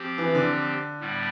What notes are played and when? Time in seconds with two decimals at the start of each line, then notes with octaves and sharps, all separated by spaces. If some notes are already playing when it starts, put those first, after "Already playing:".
Already playing: F3 C4 G4
0.18 E3
0.35 D3
1.00 A2 G3 B3